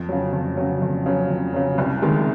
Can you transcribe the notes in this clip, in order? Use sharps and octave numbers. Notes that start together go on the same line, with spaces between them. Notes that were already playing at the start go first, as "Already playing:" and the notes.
Already playing: F2
C#3 F#3
F2
C#3 F#3
F2
C#3 F#3
F2
C#3 F#3
C2
C3 D#3 G#3